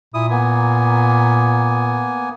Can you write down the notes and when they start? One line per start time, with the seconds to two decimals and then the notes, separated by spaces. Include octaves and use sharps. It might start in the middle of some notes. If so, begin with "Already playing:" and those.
0.14 A#2 E4 D#6
0.30 A#3 B3 G#5